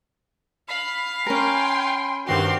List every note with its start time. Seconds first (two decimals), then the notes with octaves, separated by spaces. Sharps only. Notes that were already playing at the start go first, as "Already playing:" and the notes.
0.68 F5 B5
1.26 C#4 A#4 G5 G#5 C6
2.27 G2 D#3 C4 F#4 G4 F5 C6